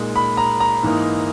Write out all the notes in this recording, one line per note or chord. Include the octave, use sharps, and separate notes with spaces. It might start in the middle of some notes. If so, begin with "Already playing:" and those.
Already playing: A#2 G#3 D#4
B5
A#5
A#5
G#2 E3 A#3 D#4